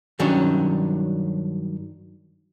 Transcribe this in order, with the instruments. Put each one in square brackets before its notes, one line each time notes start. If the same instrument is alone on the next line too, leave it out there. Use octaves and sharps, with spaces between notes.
[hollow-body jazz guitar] G2 D#3 F#3 C#4 D4